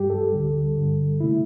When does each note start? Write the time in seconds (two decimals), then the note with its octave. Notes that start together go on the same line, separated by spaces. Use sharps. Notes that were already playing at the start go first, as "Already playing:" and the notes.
Already playing: G2 G3 G4
0.10 A4
0.32 D2 D3 G3
0.77 G2 D3 G3
1.20 C3 A3 E4